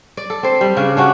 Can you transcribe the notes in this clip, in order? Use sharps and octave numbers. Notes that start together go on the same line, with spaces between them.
D5
A4
C4 C5
G3
C#3 D4
C#4 D4 F#4